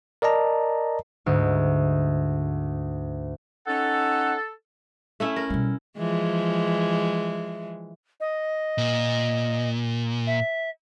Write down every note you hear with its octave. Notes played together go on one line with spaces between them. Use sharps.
A#4 D5 D#5 A5 A#5
D2 G#2
C#4 D#4 A4 F#5
A3 C#4 E4
A#4
B2 G3
E3 F3 G#3
D#5
A#2
E5